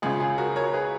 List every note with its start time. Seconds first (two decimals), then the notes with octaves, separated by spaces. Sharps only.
0.02 C#2 C#3 F4 G#4
0.20 F4 G#4
0.38 F#4 A#4
0.56 A#4 C#5
0.73 G#4 B4